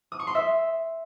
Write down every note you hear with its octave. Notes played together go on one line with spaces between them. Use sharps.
D#6
C#6
C6
E5